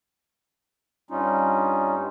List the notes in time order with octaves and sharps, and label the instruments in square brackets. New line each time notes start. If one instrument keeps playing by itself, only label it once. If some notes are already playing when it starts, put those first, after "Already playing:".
[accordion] G2 G3 C#4 D#4 F4